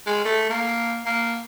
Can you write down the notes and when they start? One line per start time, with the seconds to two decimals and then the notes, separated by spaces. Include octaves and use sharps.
0.07 G#3
0.25 A3
0.50 A#3
1.06 A#3